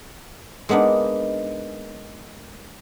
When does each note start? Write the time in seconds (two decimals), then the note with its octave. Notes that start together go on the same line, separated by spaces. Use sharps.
0.69 G#3 A#3 B3 D4 D#4